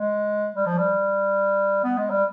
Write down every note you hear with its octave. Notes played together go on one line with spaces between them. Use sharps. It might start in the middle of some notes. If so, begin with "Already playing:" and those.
Already playing: G#3
G3
F3
G3
B3
G#3
G3